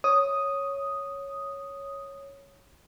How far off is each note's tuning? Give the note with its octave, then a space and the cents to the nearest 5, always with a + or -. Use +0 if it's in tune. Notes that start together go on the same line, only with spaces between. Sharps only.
C#5 +0 D#6 +0